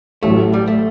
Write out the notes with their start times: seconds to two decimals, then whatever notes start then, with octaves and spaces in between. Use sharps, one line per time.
0.23 A1 A2 F#3 A3
0.53 G3
0.68 A3